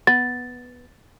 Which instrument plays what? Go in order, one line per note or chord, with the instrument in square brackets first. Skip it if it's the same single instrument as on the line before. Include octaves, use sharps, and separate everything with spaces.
[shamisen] B3 [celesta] A6